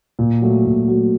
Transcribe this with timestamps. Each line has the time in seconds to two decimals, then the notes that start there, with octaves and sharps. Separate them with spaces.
0.19 A#2
0.42 F#3 A3
0.65 A#2
0.88 F#3 A3